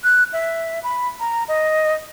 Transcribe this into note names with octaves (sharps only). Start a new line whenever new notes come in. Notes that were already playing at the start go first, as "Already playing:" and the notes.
F#6
E5
B5
A#5
D#5